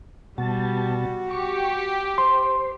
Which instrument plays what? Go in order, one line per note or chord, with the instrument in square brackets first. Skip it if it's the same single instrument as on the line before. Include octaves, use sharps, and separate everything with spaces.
[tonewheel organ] B2 A5 [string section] G3 [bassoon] F#4
[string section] G4 [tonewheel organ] C#6
[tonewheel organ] C5 [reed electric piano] C6